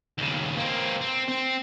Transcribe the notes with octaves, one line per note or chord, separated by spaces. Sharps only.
D#2 C#3
A#3 C4
C4
C4